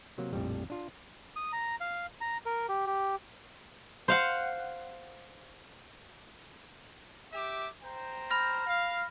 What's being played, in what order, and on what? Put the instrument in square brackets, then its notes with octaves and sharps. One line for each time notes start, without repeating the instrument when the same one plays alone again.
[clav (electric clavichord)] C3 F#3 A#3
A#1 F2 A2 G3
D4 F4
[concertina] D#6
A#5
F5
A#5
A#4
G4
G4
[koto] C5 F5 F#5
[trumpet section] G4 E5 D6
C5 G5 A#5
[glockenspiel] B5 F6 A#6
[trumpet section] F5